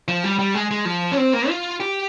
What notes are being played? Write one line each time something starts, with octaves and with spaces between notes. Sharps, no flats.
F3
G3
G3
G#3
G#3
F3
C#4
C4
A#3
F4
G4